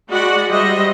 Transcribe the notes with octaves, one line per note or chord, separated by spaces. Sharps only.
G#3 F#4 D5 D#5 F#5 B5
G3 C5 D#5 E5